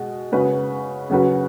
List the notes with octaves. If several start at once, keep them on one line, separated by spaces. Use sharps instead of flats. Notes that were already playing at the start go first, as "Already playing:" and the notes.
Already playing: B2 G#3
C#3 G#3 C#4 F#4 B4
C#3 F#3 C#4 F#4 B4